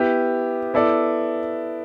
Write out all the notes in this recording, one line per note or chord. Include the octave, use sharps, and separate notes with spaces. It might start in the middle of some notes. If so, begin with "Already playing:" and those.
Already playing: B3 E4 G4
B3 E4 A4 D5